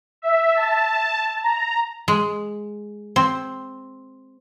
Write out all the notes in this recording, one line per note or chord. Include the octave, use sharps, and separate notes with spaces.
E5
A5
A#5
G#3
C4